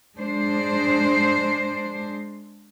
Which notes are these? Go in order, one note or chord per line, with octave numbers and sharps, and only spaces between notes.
G#3 D4 C5